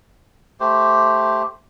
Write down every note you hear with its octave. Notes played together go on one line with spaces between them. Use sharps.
A3 G4 C5